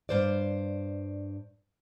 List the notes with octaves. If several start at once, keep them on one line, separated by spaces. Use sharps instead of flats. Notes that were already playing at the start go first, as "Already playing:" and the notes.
G2 C5 D5